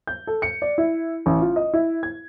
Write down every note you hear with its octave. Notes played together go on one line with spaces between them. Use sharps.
G6
A4
C#7
D5
E4
A1
F4
D#5
E4
G#6